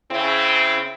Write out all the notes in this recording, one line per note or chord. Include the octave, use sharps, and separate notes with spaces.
C#3 C4 E4